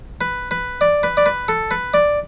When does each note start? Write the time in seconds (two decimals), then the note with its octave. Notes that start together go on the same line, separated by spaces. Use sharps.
0.21 B4
0.51 B4
0.81 D5
1.03 B4
1.17 D5
1.26 B4
1.48 A4
1.71 B4
1.94 D5